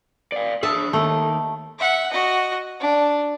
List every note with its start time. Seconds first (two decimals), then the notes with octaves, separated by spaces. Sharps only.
0.32 D5 F5
0.63 D4 G#4 E5 A5
0.93 D#2 A3
1.79 E5 F#5
2.11 F#4 D#5
2.80 D4